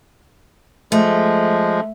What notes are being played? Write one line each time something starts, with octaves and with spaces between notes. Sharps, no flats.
F3 G#3 A3